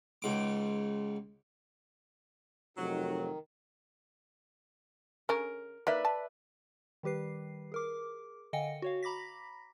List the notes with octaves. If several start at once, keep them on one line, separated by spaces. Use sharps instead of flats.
C#2 G#2 D6
F1 D#3 F#3
C#3 C#4 A#4
A#3 D#4 B4 D5 E5
A5
D#3 G3 G4 B4 C7
G#4 A#4 D6
D3 D#5 F5 G5 G#5 C#7
F#4 C#5 F5
A#5 B5 D6 A#6 B6